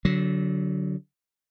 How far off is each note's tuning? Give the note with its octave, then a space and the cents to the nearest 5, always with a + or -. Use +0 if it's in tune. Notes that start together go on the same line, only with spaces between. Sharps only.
D3 -25 F#3 +0